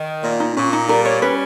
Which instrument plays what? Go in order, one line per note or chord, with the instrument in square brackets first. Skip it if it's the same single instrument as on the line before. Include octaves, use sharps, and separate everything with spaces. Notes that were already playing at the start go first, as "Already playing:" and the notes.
Already playing: [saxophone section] D#3
A#2
[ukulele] D#4
[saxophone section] A#2 [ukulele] C#4
[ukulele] D#4
[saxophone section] G3 [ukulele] A#4
[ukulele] C#5
[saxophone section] C#4 [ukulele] B4